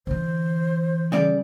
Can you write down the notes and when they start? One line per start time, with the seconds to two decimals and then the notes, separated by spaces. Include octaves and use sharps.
0.07 D3 E3 C5
1.12 C#3 G3 D5